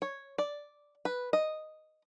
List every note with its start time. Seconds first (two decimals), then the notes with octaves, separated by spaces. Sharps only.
0.02 C#5
0.38 D5
1.05 B4
1.33 D#5